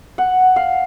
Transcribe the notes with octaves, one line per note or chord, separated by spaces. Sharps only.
F#5
F5